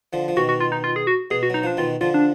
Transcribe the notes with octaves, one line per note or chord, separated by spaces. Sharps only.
D3 F3
F3
B2 D#3 F#4
F#4
F4
D#4
F4
G#4
F#4
B2 G#4
F#4
F#3 D#4
F3 D4 D#4
B2 D#3 F4
D3 F3 F4
D4